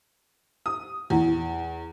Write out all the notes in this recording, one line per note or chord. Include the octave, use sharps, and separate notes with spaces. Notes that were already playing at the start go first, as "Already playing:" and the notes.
D#6
E2